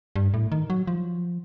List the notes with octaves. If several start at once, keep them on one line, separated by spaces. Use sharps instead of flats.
G2
A2
D#3
F#3
F3